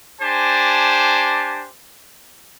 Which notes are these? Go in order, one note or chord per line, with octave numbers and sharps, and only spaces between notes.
D4 G4 C5 G#5 A5